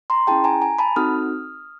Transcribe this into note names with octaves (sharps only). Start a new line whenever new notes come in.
A#5 C6
C#4 E4 G#4 G5 A5
G#5 A#5
G#5 A#5
A5 B5
C4 D#4 F#4 A4 D#6 F6